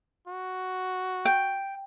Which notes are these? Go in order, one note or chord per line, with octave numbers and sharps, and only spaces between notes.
F#4
G5